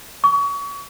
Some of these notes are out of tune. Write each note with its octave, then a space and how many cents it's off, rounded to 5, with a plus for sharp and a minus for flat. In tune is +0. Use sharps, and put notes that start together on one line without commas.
C#6 +35